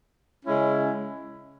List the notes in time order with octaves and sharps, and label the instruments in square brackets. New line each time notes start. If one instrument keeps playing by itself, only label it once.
[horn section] C#3 G#3 C#4 E4